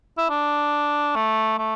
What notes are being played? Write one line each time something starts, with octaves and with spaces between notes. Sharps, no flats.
E4
D4
A3
A3